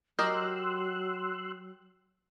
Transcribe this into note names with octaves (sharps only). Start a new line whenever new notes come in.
F#3 G4 A#4 D#5 C6 E6 F#6